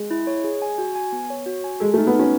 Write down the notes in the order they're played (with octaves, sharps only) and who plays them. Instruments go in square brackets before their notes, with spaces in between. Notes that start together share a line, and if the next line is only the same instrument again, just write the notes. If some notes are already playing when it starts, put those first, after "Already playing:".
Already playing: [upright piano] G#3
[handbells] E4
C#5
G#4
G#5
F#4
G#5
B3
C#5
F#4
G#5
[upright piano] G#3 [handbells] A4
[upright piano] A3
[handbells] D#4
[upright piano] B3
[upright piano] C#4 [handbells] D#4